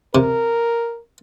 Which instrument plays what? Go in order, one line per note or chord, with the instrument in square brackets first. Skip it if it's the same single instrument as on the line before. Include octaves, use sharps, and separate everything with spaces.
[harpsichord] C3 [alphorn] A#4